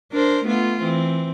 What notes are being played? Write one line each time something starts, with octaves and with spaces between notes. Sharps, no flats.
D4 A#4 C5
A3 B3 F4
E3 C4